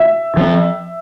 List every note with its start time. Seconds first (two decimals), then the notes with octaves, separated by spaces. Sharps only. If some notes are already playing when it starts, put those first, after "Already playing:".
Already playing: E5
0.37 F3 C4